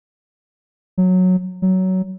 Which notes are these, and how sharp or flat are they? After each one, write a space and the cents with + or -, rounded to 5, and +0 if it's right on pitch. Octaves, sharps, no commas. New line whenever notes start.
F#3 -10
F#3 +15